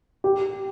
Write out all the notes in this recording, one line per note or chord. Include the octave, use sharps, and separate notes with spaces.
G4